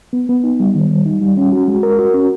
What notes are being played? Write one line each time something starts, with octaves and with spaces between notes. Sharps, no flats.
B3
B3
D#4
G3
D#3
G3
D#4
G3
C#4
F#4
G#3
A#4
F#4
C#4